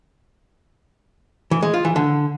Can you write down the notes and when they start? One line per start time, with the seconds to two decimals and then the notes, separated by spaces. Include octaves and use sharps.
1.51 E3
1.63 G#3
1.74 F4
1.85 E3
1.96 D3